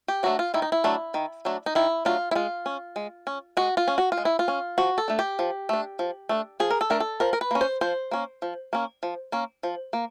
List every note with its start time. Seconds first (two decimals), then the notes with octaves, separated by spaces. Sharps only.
0.08 G4
0.23 F#3 A3 D4 F#4
0.39 F4
0.54 D#3 E4
0.62 D#4
0.72 E4
0.84 F#3 A3 D4
1.14 D#3
1.45 F#3 A3 D4
1.66 D#4
1.75 D#3 E4
2.05 F#3 A3 D4 F4
2.31 E4
2.35 G#3 F4
2.66 C#4
2.96 G#3
3.27 C#4
3.57 G#3 F#4
3.77 F4
3.88 C#4
3.98 F#4
4.12 F4
4.17 G#3
4.25 E4
4.39 F4
4.48 C#4
4.78 F3 F#4
4.98 A4
5.08 A3 D4
5.19 G4
5.39 F3
5.69 A3 D4
5.99 F3
6.29 A3 D4
6.60 F3 G#4
6.70 A#4
6.81 A4
6.90 A3 D4 A#4
7.00 A4
7.20 F3 A#4
7.33 A#4
7.41 B4
7.51 A#3 C#4
7.61 C5
7.81 F3 C5
8.11 A#3 C#4
8.42 F3
8.73 A#3 C#4
9.03 F3
9.32 A#3 C#4
9.63 F3
9.93 A#3